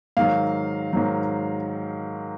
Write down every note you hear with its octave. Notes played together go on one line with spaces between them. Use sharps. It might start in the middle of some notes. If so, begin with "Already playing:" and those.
G#2 D#3 F#3 F5
G#2 D#3 F#3